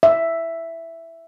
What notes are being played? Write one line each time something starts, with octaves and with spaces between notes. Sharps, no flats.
E5